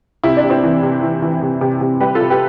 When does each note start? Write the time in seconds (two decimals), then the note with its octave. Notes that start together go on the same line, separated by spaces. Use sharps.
0.24 C3 E4
0.37 D4
0.44 C3
0.50 C4 E4
0.63 E3
0.83 C3
1.02 E3
1.22 E3
1.42 C3
1.61 C3
1.81 C3
2.00 G3 G4 B4
2.15 F4 A4
2.21 C3
2.30 G4 B4